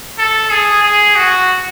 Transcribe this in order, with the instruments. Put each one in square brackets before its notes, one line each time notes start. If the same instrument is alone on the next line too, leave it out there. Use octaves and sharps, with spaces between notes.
[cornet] A4
G#4
G#4
F#4